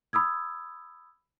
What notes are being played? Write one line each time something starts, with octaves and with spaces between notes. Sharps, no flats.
B5 D#6 E6 G#6